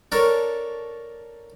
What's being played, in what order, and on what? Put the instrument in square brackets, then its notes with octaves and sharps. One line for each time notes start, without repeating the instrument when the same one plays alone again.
[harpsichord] D4 A4 A#4 C#5